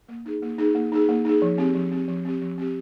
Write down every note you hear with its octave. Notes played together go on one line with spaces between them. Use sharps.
A#3
D#4 G#4
A#3
D#4 G#4
A#3
D#4 G#4
A#3
D#4 G#4
F3
C4 G4
F3
C4 G4
F3
C4 G4
F3
C4 G4